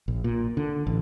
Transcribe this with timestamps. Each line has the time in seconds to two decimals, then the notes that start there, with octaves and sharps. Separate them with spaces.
0.08 A#1
0.24 A#2
0.57 D3
0.87 A1